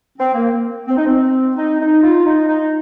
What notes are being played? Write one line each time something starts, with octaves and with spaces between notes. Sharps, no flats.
C4
A#3
C4
D#4
C4
D#4
D#4
F4
D#4
D#4